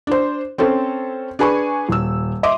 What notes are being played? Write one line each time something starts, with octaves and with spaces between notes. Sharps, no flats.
D4 C5
C4 C#4 A4 C5
D4 G#4 B4 G#5 B5 C#6
D#1 E6
D#5 E5 C6 D6